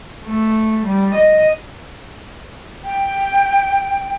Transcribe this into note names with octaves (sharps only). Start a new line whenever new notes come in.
A3
G3
D#5
G5